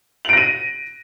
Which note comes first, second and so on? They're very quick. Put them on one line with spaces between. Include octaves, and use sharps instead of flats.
F#7 D7 A#6 D#7